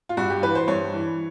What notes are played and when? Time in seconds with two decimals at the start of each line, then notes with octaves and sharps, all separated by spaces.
0.09 F4
0.17 G2 F#4
0.30 G4
0.42 E3 B4
0.55 C5
0.68 G2 C#5
0.93 E3